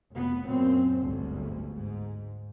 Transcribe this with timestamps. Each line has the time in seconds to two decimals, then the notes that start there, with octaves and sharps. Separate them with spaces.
0.13 F1 B3
0.46 F#2 A#2 C4
1.02 G1 D2 G#2
1.74 G#2